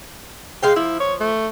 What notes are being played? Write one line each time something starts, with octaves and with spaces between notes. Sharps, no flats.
G#3 F5 G5
F3 E4
C#5
A3